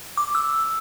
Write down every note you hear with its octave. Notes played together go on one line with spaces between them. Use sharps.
D6
E6